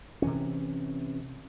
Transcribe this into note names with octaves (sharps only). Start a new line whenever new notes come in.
C3 E3 C#4